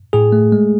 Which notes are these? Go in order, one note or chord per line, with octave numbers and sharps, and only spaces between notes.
A2 G#4
A3
G#3